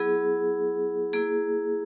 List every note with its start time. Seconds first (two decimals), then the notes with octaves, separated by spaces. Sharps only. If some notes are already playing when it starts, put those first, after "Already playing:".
Already playing: F#3 B3 E4 G#4
1.13 A#3 E4 G#4